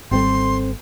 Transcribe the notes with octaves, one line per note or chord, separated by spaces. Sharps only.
G#1 G3 C4 A4 C5 C6